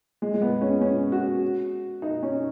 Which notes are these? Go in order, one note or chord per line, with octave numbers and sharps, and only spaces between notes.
G#3
G#3
B3
C#4
C#4
F#4
D#4
C#4